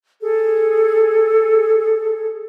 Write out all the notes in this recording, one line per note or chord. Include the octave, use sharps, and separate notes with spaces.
G#4 A4